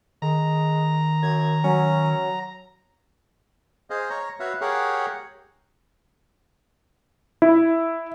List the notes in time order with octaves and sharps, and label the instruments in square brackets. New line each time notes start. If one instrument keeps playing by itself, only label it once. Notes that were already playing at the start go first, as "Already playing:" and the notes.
[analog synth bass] D#3 [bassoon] G#3 [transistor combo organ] A#5
[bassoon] F#2 [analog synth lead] G#6
[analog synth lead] F#3 [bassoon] C#4
[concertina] G#4 C5 D#5 F5
C#5 A#5
F#4 B4 C#5 E5 F5
G4 G#4 A#4 C#5 F5 F#5
[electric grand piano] E4